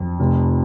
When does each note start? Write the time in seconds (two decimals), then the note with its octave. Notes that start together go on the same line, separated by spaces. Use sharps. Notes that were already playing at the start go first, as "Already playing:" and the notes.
Already playing: F2
0.19 F1